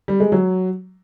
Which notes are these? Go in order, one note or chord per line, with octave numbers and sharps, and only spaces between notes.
G3
G#3
F#3